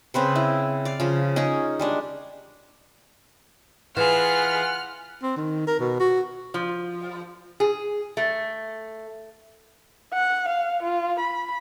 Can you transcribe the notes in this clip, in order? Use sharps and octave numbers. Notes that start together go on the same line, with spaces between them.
C#3 C4 B4 C5
E4
D5 F5
C#3 F3
C#4 D#4 G#4 A#4
G3 G#3 D4
E3 F4 G#4 F#5 B5 F6
C4
D#3
A#4
B2
F#4
F3
G#4
A3
F#5
F5
F4
B5